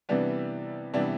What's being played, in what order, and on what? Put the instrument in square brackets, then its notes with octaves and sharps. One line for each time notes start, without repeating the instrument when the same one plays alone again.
[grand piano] C3 E3 G3 B3 D4
C3 E3 G3 B3 D4